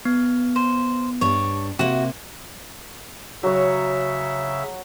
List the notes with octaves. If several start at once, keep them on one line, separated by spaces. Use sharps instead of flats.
B3
C5
G2 D4 C#5
C3 A#3 F#4
C#3 F#3 C#5 E5